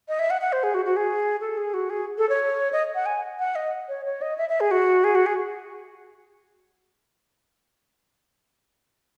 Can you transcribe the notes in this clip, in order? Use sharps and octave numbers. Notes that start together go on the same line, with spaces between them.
D#5
E5
F#5
F#5
C5
G#4
F#4
F#4
G#4
A4
G#4
F#4
G#4
A4
C#5
D#5
F#5
G#5
F#5
D#5
C#5
C#5
D#5
E5
E5
G#4
F#4
G#4
F#4
G#4